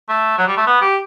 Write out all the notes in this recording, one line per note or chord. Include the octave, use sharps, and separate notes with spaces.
A3
F#3
G3
A3
B3
G4